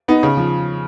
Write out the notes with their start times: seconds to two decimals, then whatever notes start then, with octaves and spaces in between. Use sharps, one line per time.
0.08 B3 D#4
0.23 C#3
0.37 F3